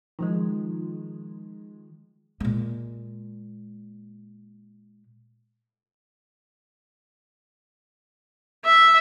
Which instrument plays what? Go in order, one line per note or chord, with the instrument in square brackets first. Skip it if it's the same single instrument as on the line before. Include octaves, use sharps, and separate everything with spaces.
[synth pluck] D#3 F3 G#3
[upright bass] A#2 G#3
[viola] E5